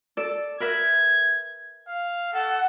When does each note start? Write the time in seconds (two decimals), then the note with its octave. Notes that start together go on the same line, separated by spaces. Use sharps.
0.17 A4 D5
0.60 A#4 B4 E5 G#6
1.88 F5
2.33 A4 F#5